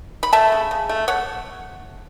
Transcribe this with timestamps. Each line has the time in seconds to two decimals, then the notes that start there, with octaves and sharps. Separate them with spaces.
0.23 B5
0.33 A3 E5 A5
0.52 C#3
0.71 C#3
0.89 A3
1.08 A3 C#5 F#5